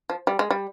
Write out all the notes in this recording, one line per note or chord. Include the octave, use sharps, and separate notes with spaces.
F3
G3
G#3
G3